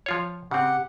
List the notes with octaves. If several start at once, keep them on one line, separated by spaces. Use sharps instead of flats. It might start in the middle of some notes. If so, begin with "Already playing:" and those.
F3 F4 C#5
C#3 C4 G4 F#5